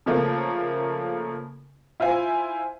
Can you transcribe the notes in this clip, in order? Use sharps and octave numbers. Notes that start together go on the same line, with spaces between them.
C#3 F3 A3 A#3
E4 F4 C5 G#5